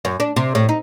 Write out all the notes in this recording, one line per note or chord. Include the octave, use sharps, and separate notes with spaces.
F#2
D4
C3
A2
D#4